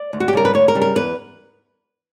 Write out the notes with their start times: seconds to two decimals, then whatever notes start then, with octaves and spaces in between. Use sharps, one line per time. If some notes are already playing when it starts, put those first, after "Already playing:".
Already playing: D5
0.13 D2
0.20 F#4
0.28 G4
0.33 C#3 G3 A#4
0.45 B4
0.54 D2 C#5
0.68 A#4
0.75 C#3 G3
0.82 A#4
0.95 E2 B4